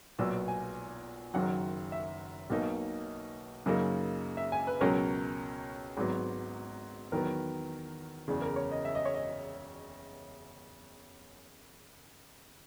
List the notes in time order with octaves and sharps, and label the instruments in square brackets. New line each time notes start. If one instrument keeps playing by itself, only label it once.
[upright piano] B1 A#2 F#3 B3 E6
G#5
F#1 F#2 D#3 F#3 F#5
E5
B1 B2 A#3 D#4
F#2 C#3 F#3 A#3 D#4
E5
G#5
B4
C#2 B2 F#3 C#4 A#4
G#1 G#2 F#3 B3
E2 D#3 F#3 B3 A#4
F#1 E2 C#3
A#4
C#5
D#5
E5
D#5
C#5
D#5